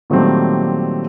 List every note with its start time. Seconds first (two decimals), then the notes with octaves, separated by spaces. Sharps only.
0.10 A#2 D#3 F#3 G3 A3 C4